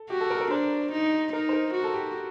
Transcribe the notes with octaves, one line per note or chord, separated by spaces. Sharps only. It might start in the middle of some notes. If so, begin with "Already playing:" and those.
Already playing: A4
F#4 G4
A4
A#4
A4
A#4
D4 C5
D#4
D#4 A#4
C5
A#4
F#4
A4
G4